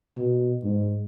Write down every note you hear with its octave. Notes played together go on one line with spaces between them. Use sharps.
B2
G#2